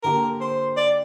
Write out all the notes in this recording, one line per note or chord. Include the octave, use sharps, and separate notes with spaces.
D3 A#3 G4 A#4
C5
D5